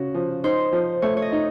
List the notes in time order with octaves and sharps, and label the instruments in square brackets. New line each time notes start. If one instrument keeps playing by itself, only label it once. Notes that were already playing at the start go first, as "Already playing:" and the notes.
Already playing: [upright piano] C#3 F#4 [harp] C#5
[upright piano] F3
[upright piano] D#4 [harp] C5
[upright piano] F3
[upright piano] A3 [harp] C#5
[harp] C#5
D#5
[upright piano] D#4